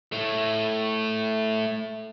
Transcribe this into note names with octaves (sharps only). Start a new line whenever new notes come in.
A2 A3